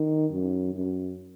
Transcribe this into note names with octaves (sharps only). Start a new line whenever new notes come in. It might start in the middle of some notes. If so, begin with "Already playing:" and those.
Already playing: D#3
F#2
F#2